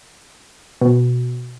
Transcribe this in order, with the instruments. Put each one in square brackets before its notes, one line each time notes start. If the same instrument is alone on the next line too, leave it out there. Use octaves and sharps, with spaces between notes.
[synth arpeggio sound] B2